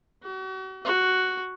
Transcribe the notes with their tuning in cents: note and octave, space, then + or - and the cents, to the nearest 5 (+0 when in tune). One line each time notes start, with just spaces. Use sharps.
F#4 +40
F#4 +5